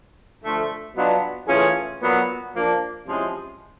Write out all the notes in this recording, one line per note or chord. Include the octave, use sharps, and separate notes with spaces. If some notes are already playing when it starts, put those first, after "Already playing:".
D3 F3 A3
B2 F#3 B3 D4 F4
E3 A3 C#4 F4 G#4
A#2 F#3 B3
F3 A#3 D4
C3 F3 G#3 C#4 E4